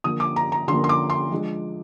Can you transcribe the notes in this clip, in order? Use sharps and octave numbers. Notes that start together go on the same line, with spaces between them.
D3 F3 A#3 D#6
D6
A#5
A#5
D3 F3 A#3 C6
C6
D6
C6
F3 G#3 D4